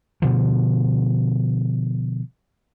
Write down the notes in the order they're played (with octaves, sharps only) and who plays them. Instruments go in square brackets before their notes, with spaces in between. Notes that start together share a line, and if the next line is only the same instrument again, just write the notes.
[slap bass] B2 D3 F3